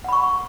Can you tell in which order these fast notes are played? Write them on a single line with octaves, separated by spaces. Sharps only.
F#5 B5 C#6